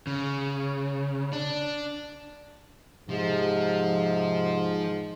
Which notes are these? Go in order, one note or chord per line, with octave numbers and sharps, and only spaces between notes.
C#3
D4
G#2 C3 F3